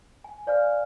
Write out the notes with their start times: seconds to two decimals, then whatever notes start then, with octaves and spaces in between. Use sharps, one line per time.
0.24 G#5
0.47 C5 D5 F5 G#5 F6